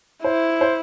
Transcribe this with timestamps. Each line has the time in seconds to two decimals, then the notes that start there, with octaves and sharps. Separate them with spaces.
0.24 E4 C5
0.61 C5